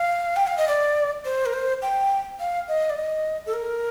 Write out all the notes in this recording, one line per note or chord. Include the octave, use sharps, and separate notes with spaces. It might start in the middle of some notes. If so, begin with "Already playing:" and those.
Already playing: F5
G5
F5
D#5
D5
C5
A#4
C5
G5
F5
D#5
D5
D#5
A4
A#4